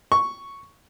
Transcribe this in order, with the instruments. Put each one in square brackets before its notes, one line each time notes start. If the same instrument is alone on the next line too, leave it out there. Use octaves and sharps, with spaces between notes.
[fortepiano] C#6